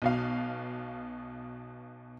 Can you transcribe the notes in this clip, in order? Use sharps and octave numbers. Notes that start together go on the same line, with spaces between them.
B1 B2 F5